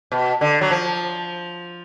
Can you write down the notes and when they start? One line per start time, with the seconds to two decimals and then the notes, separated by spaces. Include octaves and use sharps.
0.12 B2
0.41 D3
0.61 F#3
0.71 F3